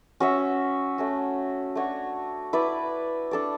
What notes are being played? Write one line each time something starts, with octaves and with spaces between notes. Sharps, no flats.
C#4 F#4 C#5 E5
A3 C#4 F#4
A3 D4 F#4 C#5
E4 B4 D5
D4 A4 D5